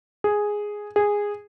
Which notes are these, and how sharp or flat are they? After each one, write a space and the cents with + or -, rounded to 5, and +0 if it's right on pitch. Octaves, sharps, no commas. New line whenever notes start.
G#4 +0
G#4 -10